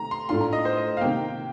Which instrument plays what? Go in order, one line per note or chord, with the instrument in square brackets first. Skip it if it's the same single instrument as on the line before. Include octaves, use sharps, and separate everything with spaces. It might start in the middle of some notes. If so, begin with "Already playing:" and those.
Already playing: [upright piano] C3 D#3 A3 [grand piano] A#5
[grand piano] C6
[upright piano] A2 A3 D4 F4 [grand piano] C6
[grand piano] A#5
D#5
C5
D#5
F5
[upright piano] C3 D#3 A#3 [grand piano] G5